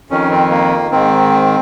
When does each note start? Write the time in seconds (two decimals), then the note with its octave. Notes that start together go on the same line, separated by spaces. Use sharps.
0.10 F2 D#3 C#4
0.31 C4
0.51 A#3
0.91 G#2 D#3 C4